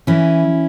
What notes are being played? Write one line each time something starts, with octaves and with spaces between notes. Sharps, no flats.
E3 C#4 E4